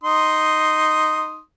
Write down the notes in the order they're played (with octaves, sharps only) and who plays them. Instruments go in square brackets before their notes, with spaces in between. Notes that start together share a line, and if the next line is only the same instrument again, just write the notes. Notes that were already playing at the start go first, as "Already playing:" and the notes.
[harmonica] D#4 C6 D#6